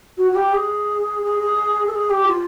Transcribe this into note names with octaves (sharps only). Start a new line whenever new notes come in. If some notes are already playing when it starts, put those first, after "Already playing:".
F#4
F#4
G4
G#4
G#4
G#4
A4
G#4
G4
F4